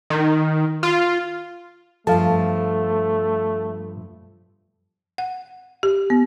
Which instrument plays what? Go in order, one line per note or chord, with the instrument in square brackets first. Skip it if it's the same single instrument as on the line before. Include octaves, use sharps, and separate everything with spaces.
[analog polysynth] D#3
F4
[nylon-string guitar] G2 F3 [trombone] A3 [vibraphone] A4 [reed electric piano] F5 A5
[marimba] F#5
G4
B3